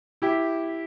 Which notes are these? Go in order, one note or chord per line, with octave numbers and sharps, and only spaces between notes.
E4 G4